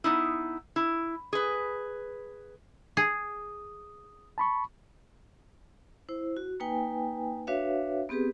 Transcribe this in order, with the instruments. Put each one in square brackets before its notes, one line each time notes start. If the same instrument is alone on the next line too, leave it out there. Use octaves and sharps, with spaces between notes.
[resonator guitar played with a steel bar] B3 D#4 E4
E4
G#4 B4
[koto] G#4 [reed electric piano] D#6
[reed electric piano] A5 B5 C#6
[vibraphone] E4 C5
F#4
A#3 D#4 B4 G5 G#5
D4 F#4 B4 C#5 E5 F5
B3 C4 G4 G#4 B4